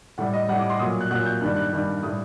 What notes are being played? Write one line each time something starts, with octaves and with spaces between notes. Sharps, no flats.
A2 G3 F#5
D#5
A2 G3 F#5
D6
C6
A#2 F#3 D#6
F#6
A#2 F#3 F#6
G6
G2 D#3 G3 F#6
F#6
G2 D#3 G3
A2 G3 D#6